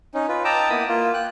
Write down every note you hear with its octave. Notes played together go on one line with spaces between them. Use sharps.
C#4 D#4
F4 B4
D#5 G5 A5 A#5 D6 E6
A#3 B3 E4 B5 D#6
A#3 F4
G5 F#6